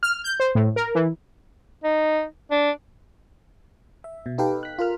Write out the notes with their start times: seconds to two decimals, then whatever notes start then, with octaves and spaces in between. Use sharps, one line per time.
0.03 F6
0.24 G6
0.40 C5
0.55 A2
0.76 A#4
0.95 E3
1.84 D#4
2.51 D4
4.04 E5
4.26 B2
4.38 D#4 G4 A4 B4 F5 G5
4.63 F#6 B6
4.79 F4 A#4 F6